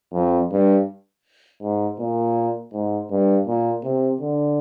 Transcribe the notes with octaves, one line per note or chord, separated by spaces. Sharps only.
F2
G2
G#2
A#2
G#2
G2
A#2
C3
D3